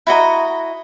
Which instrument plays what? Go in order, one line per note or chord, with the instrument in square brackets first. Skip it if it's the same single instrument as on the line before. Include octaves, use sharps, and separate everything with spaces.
[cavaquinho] E4 F#4 D#5 A#5